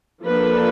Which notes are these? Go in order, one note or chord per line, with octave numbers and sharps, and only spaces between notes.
F3 A#3 D4 A4 B4